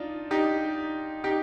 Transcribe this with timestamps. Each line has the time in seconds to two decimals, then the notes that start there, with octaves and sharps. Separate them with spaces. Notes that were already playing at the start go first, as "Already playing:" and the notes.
Already playing: D4 D#4 F4
0.31 D#4 G4
1.24 D#4 G4